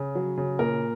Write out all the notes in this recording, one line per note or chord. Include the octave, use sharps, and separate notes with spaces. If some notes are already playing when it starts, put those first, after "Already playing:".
Already playing: C#3
F#3
C#3
A#2 A#4